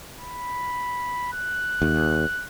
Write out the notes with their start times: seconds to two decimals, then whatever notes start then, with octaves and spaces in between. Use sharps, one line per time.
0.20 B5
1.33 F#6
1.82 D#2